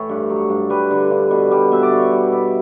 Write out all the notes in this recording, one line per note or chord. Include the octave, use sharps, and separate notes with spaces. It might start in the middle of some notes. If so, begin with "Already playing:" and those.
Already playing: A2 E3 C#5
G2
F#3
G2
G3 B4
D3
G2
B2
G3
B2 E5
D5
B2 C#5
G3
B2 E5